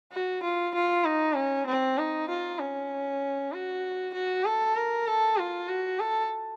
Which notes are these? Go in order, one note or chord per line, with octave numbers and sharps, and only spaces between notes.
F#4
F4
F4
D#4
C#4
C4
D#4
F4
C#4
F#4
F#4
A4
A#4
A4
F4
F#4
A4